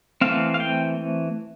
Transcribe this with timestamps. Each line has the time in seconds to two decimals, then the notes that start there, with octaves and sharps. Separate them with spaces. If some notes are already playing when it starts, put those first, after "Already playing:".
0.21 E3 A3 C4 F5
0.54 F5
0.60 G5